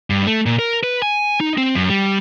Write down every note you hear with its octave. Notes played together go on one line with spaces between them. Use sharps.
G2
A3
A#2
A#4
B4
G#5
D#4
C4
F#2
G3